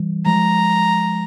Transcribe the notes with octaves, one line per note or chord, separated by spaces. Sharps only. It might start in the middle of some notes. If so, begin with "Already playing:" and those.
Already playing: E3 G3
F3 G#3 A#5